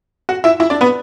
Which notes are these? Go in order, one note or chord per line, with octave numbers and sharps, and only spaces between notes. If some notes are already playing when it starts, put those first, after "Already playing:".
F#4 F#5
E4 E5
E4 E5
D4 D5
B3 B4